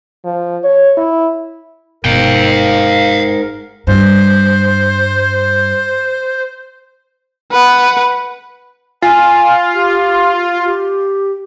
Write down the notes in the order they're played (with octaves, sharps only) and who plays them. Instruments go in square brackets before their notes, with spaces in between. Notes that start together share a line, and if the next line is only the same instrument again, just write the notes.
[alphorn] F3
C#5
E4
[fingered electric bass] G1 B2 [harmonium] G#2 A#4 [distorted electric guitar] F5 G5
[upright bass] G2 [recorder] C5
[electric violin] B4 F#5
[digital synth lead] F4 [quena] G#5
[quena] G4
G4